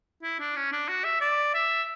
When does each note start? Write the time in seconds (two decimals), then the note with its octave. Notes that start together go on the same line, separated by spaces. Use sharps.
0.23 E4
0.40 D4
0.56 C#4
0.72 D4
0.88 F#4
1.04 E5
1.21 D5
1.54 E5